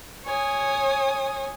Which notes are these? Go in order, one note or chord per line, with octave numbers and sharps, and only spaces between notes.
C#5 G#5 D#6